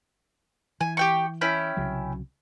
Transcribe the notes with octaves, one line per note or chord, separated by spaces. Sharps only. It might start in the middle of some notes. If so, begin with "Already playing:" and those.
E3 G#5
G4 G5 C#6
C#4 E4 G5
C2 C#3 F#3